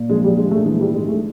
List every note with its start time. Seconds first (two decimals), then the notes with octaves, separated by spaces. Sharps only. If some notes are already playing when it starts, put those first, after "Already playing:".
Already playing: A#2
0.10 F3 G#3
0.24 G3
0.28 F3
0.37 G#3
0.47 A#2 A3
0.66 E3 G#3
0.80 G3
0.85 G#2
0.95 G#3
1.04 E3 A3